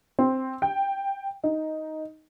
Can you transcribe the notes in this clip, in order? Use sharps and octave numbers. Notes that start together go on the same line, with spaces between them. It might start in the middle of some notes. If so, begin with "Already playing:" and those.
C4
G5
D#4